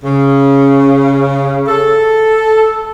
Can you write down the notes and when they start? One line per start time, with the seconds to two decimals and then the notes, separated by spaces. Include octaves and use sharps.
0.04 C#3
1.67 A4